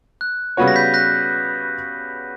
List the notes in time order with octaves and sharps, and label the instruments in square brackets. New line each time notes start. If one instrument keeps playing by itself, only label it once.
[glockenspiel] F#6
[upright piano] C#3 G3 B3 F#4 C#5
[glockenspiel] A#6
G6 B6
F#6 A#6